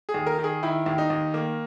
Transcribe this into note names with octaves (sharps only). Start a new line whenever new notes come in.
G#4
D#2
A#4
D#3
G#4
D#3 E4
D#2
D#4
D#2
D#3 A#3